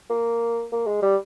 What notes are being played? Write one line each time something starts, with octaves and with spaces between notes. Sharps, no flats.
A#3
A#3
G#3
G3